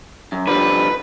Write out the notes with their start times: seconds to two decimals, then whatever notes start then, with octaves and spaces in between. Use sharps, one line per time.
0.32 F#2
0.47 D3 F3 G3 B4